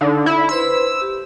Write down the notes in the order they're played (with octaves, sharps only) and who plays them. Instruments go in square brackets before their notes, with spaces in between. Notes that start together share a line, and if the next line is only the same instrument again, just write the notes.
[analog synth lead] D3 [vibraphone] D#4
[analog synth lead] E4
[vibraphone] B4 C5 C6 [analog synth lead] E6
[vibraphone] G4